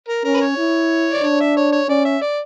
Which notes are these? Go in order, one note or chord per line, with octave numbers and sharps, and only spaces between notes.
A#4
C#4 A#4
B4
C#5
E4
D5
D4 C#5
E5
C#5
C#5
C#4 D5
E5
D5